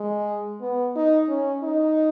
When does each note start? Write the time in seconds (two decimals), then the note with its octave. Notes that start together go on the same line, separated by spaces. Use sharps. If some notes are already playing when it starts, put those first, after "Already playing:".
Already playing: G#3
0.61 B3
0.96 D#4
1.29 C#4
1.63 D#4